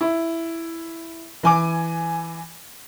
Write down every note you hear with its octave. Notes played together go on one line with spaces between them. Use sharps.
E4
E3 G#5 D6